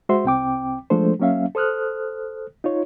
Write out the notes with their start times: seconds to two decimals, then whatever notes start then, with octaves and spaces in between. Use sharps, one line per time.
0.09 G#3 F#4 C5 E5 C6
0.25 C2 C4 G5 D6
0.90 F3 G#3 A3 D4 A4 C5
1.19 F#3 A#3 C#4 E5 F5
1.55 A4 C5 D#6 F6 F#6
2.64 D#4 F4 C#5